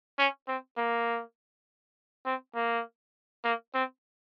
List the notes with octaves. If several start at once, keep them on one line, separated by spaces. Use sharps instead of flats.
C#4
C4
A#3
C4
A#3
A#3
C4